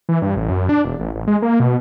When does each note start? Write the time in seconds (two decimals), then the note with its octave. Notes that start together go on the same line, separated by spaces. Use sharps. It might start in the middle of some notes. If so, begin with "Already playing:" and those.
0.09 E3
0.22 G2
0.36 A1
0.49 F#2
0.69 D4
0.85 E1
1.00 A1
1.15 A1
1.27 G#3
1.42 A#3
1.60 B2